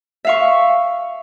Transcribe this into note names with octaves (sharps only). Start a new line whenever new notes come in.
E5 F5 C#6